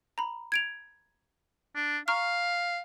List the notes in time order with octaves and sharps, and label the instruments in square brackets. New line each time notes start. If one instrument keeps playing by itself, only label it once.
[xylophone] A#5 B5
G#6 D7 F7
[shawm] D4
[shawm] F5 [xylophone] A#5 C#6 F6